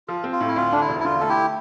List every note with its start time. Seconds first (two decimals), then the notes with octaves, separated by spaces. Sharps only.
0.08 F3 F4
0.24 C4
0.32 F4
0.40 A2
0.48 E4
0.56 D2 F4
0.72 D3 D4
0.81 E4
0.88 E1
1.00 E4
1.05 D3 F4
1.20 A3 A4
1.29 E4 G4